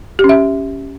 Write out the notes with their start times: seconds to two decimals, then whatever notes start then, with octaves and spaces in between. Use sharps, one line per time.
0.19 G4
0.24 C#4
0.29 E5